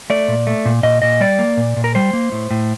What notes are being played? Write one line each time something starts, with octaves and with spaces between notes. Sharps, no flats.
A3 D5
A#2
A3
A#2
A#2 D#5
A#2 D#5
G3 D5
A#3
A#2
A#2
A#4
G3 C5
A#3
A2
A2